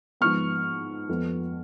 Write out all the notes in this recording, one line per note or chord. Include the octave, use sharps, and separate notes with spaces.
G#2 F3 B3 C#6 F6
F2 F3 B3